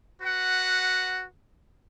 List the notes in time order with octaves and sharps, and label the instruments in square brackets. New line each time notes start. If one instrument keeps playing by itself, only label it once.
[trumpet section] F#4 B4 F#5